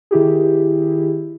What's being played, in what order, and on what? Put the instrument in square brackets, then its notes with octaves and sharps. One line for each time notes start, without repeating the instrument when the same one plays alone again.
[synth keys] D#3 E4 G4 G#4